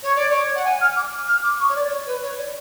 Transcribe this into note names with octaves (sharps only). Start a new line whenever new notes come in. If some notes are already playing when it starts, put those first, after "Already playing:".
C#5
D5
C#5
F#5
G#5
F6
D6
F6
D6
C#6
C#5
D5
C#5
B4
C#5
D5